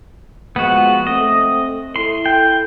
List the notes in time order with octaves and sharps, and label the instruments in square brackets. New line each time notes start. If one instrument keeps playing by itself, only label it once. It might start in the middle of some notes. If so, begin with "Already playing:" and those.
[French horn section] F3 G#3 [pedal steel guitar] B3 F#4
[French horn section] A3 C4 [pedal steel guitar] D#5
[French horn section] E4 A4 [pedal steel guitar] C6
[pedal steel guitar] G5